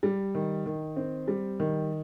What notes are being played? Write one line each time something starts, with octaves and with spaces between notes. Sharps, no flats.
G3
D#3
D#3
C4
G3
D#3